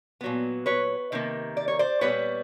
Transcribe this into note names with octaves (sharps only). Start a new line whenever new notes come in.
A#2 F#3 B3
B4 C#5
C3 D#3 A#3
D5
C#5
C5 D5
A#2 G3 B3 B4 C#5